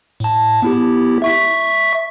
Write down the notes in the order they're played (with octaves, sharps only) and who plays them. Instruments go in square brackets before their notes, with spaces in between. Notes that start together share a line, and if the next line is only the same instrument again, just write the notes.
[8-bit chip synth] A2 A5
B3 E4 G4
E5 C#6 B6